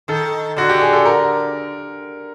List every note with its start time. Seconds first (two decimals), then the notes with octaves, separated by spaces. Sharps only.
0.08 D#3 A4
0.56 D3 F#4
0.69 G4
0.81 G#4
0.93 A4
1.06 A#4